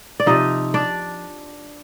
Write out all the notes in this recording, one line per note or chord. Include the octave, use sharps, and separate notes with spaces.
D5
C3 F3 D#4 D#5
D4 D5